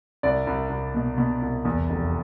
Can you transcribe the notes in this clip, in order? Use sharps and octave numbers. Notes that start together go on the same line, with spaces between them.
C2 D5
C2
C2
B2
B2
C2
E2
F1